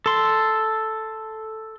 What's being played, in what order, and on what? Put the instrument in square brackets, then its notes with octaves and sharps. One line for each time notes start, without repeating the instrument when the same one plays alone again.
[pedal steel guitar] A4 C6